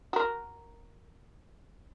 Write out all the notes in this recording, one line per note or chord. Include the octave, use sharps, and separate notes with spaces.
F#4 A#4